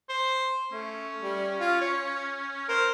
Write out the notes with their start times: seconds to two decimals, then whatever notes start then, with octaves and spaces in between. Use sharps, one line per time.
0.09 C5
0.72 A3 C#4
1.23 G3
1.61 F4
1.81 C#5
2.69 A#4 C5